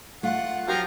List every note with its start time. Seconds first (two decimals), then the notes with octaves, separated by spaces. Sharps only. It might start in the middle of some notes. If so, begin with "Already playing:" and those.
0.23 A3 F4 F#5
0.68 F3 F#3 G4 F5 A#5